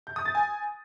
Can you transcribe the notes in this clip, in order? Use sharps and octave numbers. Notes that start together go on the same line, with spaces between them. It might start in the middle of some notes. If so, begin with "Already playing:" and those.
G6
D#6
A6
G#5